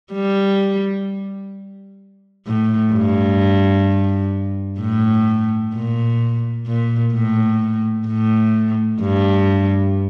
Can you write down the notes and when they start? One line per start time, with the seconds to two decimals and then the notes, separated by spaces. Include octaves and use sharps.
0.13 G3
2.47 A2
2.93 G2
4.80 A2
5.74 A#2
6.67 A#2
7.13 A2
8.07 A2
9.01 G2